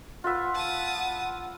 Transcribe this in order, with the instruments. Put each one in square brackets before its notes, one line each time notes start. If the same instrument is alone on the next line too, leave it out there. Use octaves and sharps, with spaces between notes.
[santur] F4 B4 E5 [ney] F#5
[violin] A5 D#6